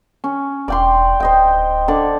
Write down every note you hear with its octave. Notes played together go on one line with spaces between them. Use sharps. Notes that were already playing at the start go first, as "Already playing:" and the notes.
C#4
E1 D5 G5 C6
D1 C5 D#5 G5
D3 D5